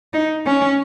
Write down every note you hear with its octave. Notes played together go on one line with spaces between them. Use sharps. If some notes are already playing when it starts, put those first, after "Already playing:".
D#4
C#4